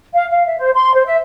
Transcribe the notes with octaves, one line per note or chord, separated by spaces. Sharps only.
F5
F5
E5
C5
C6
C5
E5